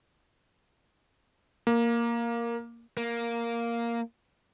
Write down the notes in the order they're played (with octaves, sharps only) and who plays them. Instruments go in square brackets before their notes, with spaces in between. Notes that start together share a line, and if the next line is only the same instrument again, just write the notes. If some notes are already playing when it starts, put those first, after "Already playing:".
[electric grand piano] A#3
[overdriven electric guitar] A#3